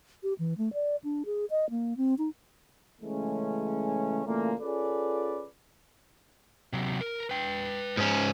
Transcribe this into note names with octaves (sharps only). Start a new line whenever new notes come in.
G4
E3
A3
D5
D4
G#4
D#5
A#3
C4
D#4
C#3 E3 G#3 A3 C#4
A#2 C#3 E3 A3 A#3
C#4 F4 G#4 A4 B4 D5
C3 F#3
A#4
B4 G5
G#2 C#4